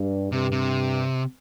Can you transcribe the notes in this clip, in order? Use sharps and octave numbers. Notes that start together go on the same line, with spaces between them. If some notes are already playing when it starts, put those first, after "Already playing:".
Already playing: G2
G2 C3
C3